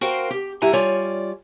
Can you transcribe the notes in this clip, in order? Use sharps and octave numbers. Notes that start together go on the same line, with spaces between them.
F#4 A#4 C5 F5 G5
G4
G2 E4 G4 F#5 G#5 A#5
G3 F4 C#5 D5 G#5